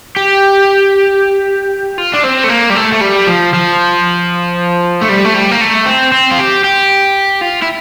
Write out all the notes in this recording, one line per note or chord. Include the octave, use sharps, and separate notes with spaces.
G4
F4
D4
C4
A3
A#3
G3
A3
A3
G3
F3
F3
A3
G3
A3
G3
A#3
A3
C4
C4
F4
G4
G4
F4
E4